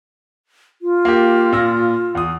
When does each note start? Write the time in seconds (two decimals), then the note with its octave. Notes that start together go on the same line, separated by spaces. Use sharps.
0.82 F4
1.05 A#3 G4
1.52 A#2 E6 A#6
2.15 E2 D#6